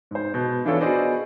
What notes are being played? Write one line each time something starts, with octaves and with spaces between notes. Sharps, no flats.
G#2 C5
B2 G6
E3 D4 F4 A4 C#5
B3 F#4 G#4 C5 D5 D#5